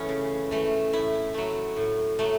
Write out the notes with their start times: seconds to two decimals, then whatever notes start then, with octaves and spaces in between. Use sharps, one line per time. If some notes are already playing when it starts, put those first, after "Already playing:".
Already playing: E3 A3 B3 C#4
0.09 C#3
0.51 E3 A3
0.93 A2 E4
1.34 F#3 A3
1.77 A2
2.19 F#3 A3